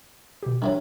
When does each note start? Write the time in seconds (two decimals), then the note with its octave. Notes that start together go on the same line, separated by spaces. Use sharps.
0.43 B2 G4
0.62 D#3 E3 F#3 G3 D4